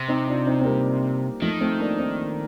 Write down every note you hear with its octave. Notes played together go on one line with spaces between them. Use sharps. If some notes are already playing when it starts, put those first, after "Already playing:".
Already playing: C3
C4 D#4
D4 F4
C4 D#4
C4
G3 A#3
D#3 F3 A3
A3 C4
A#3 D4
C4 D#4